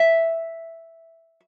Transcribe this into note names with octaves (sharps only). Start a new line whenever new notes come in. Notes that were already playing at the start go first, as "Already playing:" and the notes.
Already playing: E5